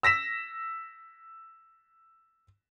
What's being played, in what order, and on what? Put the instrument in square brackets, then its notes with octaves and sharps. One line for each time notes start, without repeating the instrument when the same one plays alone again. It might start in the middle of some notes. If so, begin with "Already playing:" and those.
[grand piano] E6 A#6 B6 E7